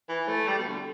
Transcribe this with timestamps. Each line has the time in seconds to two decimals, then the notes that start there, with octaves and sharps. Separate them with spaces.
0.09 E3
0.28 A3
0.48 G3
0.59 B2
0.67 D3